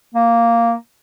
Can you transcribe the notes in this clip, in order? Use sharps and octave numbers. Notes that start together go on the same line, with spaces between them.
A#3